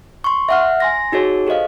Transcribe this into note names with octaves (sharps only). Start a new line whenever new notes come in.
C6 C#6
E5 F#5 F6
G#5 C6 A#6
D#4 F#4 G#4 C#5
G4 A4 C5 D#5 F5